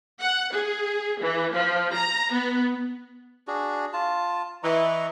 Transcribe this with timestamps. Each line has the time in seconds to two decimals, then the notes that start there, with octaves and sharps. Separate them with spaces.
0.21 F#5
0.53 G#4
1.21 E3
1.53 F3
1.93 A#5
2.32 B3
3.47 D4 F#4 G#4
3.93 F4 A5
4.63 E3 D#5 A#5 C#6